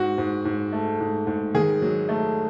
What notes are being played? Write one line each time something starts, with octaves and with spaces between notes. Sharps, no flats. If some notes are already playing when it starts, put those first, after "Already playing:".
Already playing: G#2 F#4
G#2
G#2
A3
G#2
G#2
D#3 G#4
F#3
A3